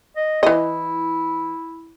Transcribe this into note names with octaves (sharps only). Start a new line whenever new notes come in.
D#5
E3 E4 D#5